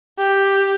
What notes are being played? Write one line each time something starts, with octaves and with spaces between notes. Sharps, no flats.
G4